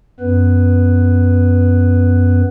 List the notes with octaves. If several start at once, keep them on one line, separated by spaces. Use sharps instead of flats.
F#2 B3 B4